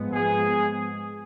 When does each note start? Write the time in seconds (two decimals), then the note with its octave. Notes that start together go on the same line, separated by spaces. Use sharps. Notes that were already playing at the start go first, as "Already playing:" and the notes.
Already playing: G#2 F3 G#3 B3
0.12 G#4